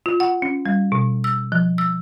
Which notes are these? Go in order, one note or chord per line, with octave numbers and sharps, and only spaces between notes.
F4
F#5
C#4
G3
B2
E6
F3
E6